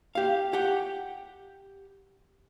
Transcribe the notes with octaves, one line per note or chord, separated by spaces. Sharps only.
G4 F5
G4 F#5 G5